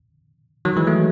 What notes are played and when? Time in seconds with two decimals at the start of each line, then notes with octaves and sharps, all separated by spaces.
0.65 D#3 F#3
0.77 E3 G#3
0.87 F#3 A3